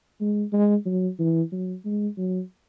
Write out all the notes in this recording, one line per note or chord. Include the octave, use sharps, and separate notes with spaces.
G#3
G#3
F#3
E3
F#3
G#3
F#3